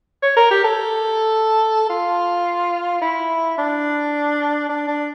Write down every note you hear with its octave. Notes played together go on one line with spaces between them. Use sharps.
C#5
A#4
G4
A4
F4
E4
D4
D4
D4